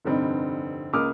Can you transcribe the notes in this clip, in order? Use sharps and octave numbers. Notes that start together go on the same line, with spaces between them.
F1 G2 D3 C4 D#4
C#2 A#3 D6 D#6 F6